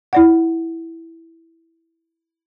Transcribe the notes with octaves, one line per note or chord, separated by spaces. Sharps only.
E4 D5 F#5